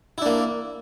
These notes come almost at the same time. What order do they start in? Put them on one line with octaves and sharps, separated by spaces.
E4 D4 A#3